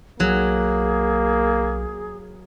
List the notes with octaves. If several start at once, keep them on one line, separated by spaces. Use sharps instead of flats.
B1 F#3 A#3 G#4